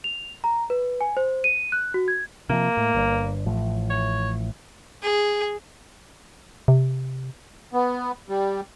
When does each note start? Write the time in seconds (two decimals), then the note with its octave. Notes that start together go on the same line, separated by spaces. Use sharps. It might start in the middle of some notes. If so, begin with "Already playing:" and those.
0.04 F7
0.44 A#5
0.70 B4
1.01 G#5
1.17 C5
1.44 D#7
1.72 F#6
1.94 F#4
2.08 G#6
2.49 C3 D#3 F3 A#3
2.77 A2
2.95 G1 G2
3.46 A1 A2 F3
3.90 C#5
5.03 G#4
6.68 C3
7.73 B3
8.29 G3